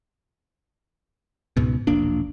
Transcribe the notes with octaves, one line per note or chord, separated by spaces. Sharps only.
C#2 G#2 B2
E1 A#1 A#3 D4